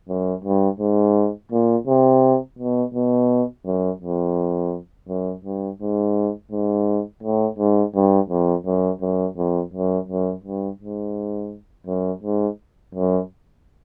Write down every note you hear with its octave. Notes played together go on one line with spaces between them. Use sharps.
F#2
G2
G#2
A#2
C3
B2
B2
F#2
F2
F#2
G2
G#2
G#2
A2
G#2
G2
F2
F#2
F#2
F2
F#2
F#2
G2
G#2
F#2
G#2
F#2